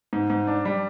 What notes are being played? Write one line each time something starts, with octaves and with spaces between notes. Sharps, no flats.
G#2
G#2
D4
G3